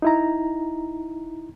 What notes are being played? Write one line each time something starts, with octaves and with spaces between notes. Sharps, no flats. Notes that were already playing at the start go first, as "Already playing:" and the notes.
D#4 E4 A#5